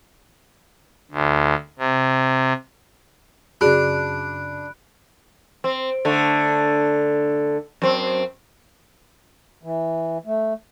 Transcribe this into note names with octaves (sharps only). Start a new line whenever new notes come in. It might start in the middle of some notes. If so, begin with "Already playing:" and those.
D2
C3
F#2 C#3 D4 F#4 G#4 B5 F#6 D7
C4
D3 A3
F#2 C4
E3
A3